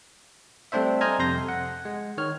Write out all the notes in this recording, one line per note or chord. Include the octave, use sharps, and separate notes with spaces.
G3 A3 C4 D4 C5 E5
C5 D#5 G#5 A#5 F6 G#6
F2 C3 A4 C6 G6 A#6
F#5
G#3
D#3 C#5 F6